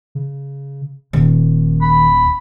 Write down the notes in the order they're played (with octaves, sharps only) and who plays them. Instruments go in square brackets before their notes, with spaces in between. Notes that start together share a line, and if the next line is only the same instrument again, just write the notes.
[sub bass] C#3
[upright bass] D#1 [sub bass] D#3
[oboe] B5